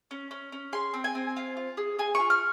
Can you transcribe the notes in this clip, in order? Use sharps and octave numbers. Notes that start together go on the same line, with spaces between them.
C#4
C#4
C#4
G#4 C6
C4
G#5
C4
F4
F4
G#4
G#4 G#5
F4 C#6
F6